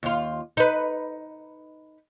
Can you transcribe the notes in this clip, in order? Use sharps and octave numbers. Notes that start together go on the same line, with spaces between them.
D#2 F4
D#4 B4